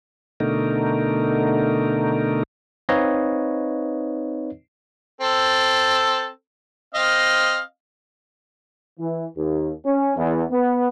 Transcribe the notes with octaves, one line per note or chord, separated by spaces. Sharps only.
B2 D3 A3 D#4 A#4
C4 D#4 B4 C#5 D#5 F5
C4 A4
C4 D#5 F5
E3
D#2
C#4
E2
B3